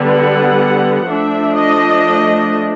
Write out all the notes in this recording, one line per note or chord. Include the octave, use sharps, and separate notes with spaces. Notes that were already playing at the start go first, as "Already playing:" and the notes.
Already playing: D3 G3 B3
F#5
F3 A3 D4 E5
D#5